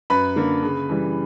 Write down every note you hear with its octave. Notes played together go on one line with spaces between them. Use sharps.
F#2 B4 B5
D3 A#3
C#3
E3 G3